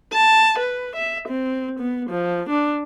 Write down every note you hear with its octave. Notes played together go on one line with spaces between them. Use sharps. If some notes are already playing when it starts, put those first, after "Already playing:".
A5
B4
E5
C4
B3
F3
D4